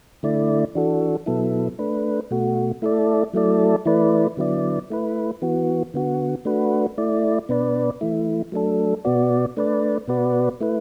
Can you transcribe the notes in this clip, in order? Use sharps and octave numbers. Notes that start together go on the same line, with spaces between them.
D3 A3 E4 D5
E3 D4 F#4 A4
B2 F#3 B3 E4 A4
A3 D4 B4
B2 A3 F#4
A3 E4 A4 D5
F#3 A3 E4 A4 D5
E3 A3 E4 B4 D5
D3 F#3 B3 E4 D5
A3 E4 B4
E3 B3 F#4
D3 B3 F#4
A3 D4 F#4 B4
A3 E4 D5
B2 B3 D4 B4 D5
E3 A3 E4
F#3 A3 D4 A4
B2 B3 F#4 D5
A3 D4 B4 D5
B2 B3 F#4 B4 D5
A3 E4 B4